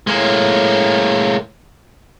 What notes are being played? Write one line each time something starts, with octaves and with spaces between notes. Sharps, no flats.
A2 G#3 A#3